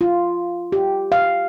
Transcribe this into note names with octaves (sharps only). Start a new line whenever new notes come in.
F4
G4
F5